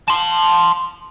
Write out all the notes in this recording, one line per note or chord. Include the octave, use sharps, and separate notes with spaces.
A5 C6